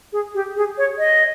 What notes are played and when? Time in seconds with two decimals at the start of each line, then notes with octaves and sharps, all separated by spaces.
0.13 G#4
0.35 G4
0.56 G#4
0.78 C#5
0.98 D#5